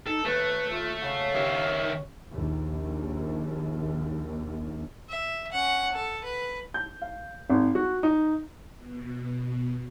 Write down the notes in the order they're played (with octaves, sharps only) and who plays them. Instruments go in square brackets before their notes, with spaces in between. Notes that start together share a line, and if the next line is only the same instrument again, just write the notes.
[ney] D#4 [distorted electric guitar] A4
[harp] D#2 [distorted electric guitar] A3 [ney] B4
[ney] F4
[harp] C#3 F#4 [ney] F5
[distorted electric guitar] D#3 E4 [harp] C#4 G4
[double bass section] A#1 D#2
[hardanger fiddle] E5
C#4 F#5
A4
B4
[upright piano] G6
F5
G#1
F#4
D#4
[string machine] B2